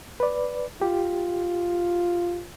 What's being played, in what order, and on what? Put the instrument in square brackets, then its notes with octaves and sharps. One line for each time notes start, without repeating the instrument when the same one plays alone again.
[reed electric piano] B4 D5
[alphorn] F4 [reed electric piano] G4